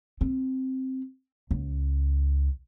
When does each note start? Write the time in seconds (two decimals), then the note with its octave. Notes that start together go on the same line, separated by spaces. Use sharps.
0.21 C4
1.51 C#2